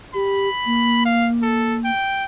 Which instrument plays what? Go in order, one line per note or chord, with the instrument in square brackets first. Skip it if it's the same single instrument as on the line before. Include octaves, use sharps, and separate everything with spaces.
[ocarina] G4 [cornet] B5
[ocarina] A#3
[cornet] F5
A4
G5